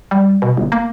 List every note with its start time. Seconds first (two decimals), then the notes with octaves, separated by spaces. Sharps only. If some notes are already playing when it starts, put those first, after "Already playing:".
0.11 G3
0.42 B2
0.57 G1
0.72 A#3